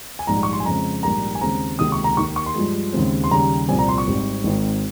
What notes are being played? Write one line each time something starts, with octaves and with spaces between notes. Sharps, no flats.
G#5
A#1 G#2 G3 A#5
C#6
C6
G#5
F2 C#3 G#3 C4 A#5
A#1 G#2 G3 A#3 A#5
G#5
D#2 C#3 G#3 C4 A#5
C#2 C3 D#3 A#3 D#6
C#6
A#5
D#2 D#3 A#3 C#6
C#6
C6
G2 F3 G#3
D#2 C#3 G#3 C4
C6
D#2 C#3 G3 A#5
C2 A#2 F3 C4 G#5
A#5
C6
C#6
G#1 G#2 G3 C4
G#1 G#2 D#3 G#3 C4